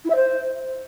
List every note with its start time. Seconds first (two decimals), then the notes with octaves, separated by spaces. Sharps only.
0.05 E4
0.10 E5
0.16 C5